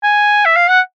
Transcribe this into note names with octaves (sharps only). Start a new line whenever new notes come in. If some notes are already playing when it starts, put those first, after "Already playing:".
G#5
E5
F5
F#5